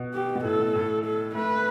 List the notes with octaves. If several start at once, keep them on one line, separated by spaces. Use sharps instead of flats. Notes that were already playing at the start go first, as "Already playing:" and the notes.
Already playing: B2
G4
B2
A2 A4
B2
A2
A4
A3 B4